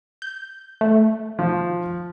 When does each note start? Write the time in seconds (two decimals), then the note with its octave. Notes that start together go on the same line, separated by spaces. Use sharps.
0.22 G6
0.81 A3
1.39 F3